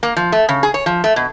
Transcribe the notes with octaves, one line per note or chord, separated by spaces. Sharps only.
A#3
F3
A3
C#3
G#4
C#5
F3
A3
B2